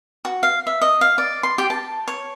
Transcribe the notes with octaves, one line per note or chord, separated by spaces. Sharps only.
F#4
F5
E5
D#5
F5
D5
C6
G4
A5
C#5